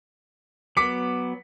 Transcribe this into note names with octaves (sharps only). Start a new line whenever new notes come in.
F#3 B3 D6 B6 C#7